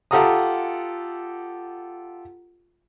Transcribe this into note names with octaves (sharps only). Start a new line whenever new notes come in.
F4 G4 A4 F#5 A#5 D#6